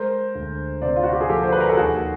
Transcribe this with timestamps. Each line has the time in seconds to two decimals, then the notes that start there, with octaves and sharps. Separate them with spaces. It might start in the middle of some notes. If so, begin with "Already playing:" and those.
Already playing: G#3 A#4 C5
0.35 D2
0.82 C3 C5 D5
0.96 F4
1.03 F#4
1.12 G4
1.21 G#4
1.29 F3 G4 A4
1.43 C5
1.52 B4
1.60 A#4
1.69 A4
1.77 D#2 F#4 G#4